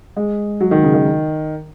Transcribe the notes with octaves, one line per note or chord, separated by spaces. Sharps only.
G#3
F#3
D#3
C#3
D#3